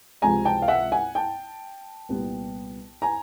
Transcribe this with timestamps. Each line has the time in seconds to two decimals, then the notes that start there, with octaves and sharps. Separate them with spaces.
0.22 C#2 C3 F3 G#3 C4 G#5 A#5
0.45 G5 A5
0.62 F5
0.68 E5 F#5
0.92 F#5 G#5
1.15 G5 A5
2.09 C2 A#2 G3 B3
3.02 G#5 A#5